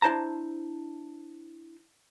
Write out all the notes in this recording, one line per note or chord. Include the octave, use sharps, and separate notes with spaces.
D4 E4 C5 A5 A#5